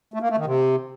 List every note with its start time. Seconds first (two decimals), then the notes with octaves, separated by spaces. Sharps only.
0.14 A3
0.22 A#3
0.30 A3
0.38 D#3
0.46 C3